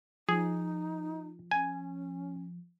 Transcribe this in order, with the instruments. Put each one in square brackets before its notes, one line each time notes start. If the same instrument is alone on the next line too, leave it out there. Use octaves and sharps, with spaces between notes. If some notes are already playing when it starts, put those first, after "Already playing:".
[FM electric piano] F3 [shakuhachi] D#4 [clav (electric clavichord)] G#4
[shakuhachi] C#4 [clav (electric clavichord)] G#5